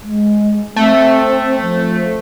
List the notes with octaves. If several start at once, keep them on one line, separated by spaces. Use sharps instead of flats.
G#3
A3 C4
F3